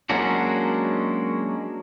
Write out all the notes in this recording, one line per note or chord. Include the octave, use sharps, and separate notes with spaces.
F#3 G#3 A#3 C#4 D4 F#4